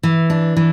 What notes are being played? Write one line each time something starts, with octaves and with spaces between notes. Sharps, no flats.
E3
D4
E3